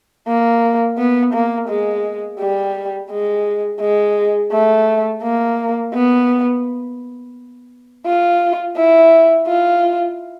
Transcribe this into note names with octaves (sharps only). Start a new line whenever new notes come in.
A#3
B3
A#3
G#3
G3
G#3
G#3
A3
A#3
B3
F4
E4
F4